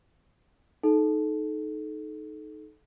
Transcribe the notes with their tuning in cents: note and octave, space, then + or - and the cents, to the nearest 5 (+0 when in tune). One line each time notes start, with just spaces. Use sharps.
D#4 +0 A4 -30